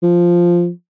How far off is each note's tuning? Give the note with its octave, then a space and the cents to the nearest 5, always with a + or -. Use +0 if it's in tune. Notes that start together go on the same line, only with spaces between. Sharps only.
F3 -5